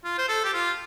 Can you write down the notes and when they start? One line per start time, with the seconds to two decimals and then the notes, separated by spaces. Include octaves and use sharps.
0.04 F4
0.18 C5
0.28 A4
0.44 G4
0.53 F4